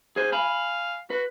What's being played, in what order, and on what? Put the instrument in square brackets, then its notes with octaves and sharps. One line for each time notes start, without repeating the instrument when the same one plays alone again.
[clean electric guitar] G#4 C5 [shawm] G#5
[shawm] F5 [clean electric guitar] G#5 B5
[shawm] F#4 [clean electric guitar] B4